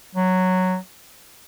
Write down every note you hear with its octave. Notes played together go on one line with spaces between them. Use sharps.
F#3